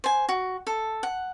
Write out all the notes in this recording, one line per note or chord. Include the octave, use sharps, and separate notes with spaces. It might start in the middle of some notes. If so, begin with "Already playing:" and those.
C5 G#5
F#4
A4
F#5